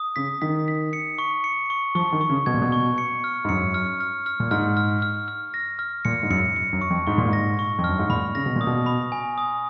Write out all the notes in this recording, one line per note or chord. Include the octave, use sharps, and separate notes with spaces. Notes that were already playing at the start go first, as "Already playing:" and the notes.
Already playing: D#6
C#3 B6
D#3 B6
B6
C#7
C#6
C#7
C#6
F3 C#6
D#3
C#6
C#3
B2 G#6
A#2
B2
C#6
C#7
F6
G#2
F#2 C#7
F6
F6
F6
A#2
G#2 F6
F6
F6
F6
A#6
F6
A#2 C#7
G#2
F#2 C#7
C#7
F#2
C#6
F2
G#2 C#6
A#2
G#2 A#6
C#6
F2
F#2 F6
G#2
A#2 B5
C#3 A#6
B2
A#2 D#6
B2
B5
G#5
D#6